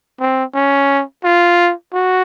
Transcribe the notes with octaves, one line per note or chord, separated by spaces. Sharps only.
C4
C#4
F4
F#4